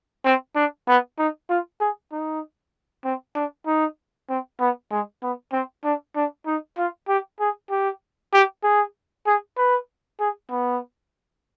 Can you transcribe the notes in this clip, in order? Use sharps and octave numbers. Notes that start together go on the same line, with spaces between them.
C4
D4
B3
D#4
F4
G#4
D#4
C4
D4
D#4
C4
B3
G#3
B3
C4
D4
D4
D#4
F4
G4
G#4
G4
G4
G#4
G#4
B4
G#4
B3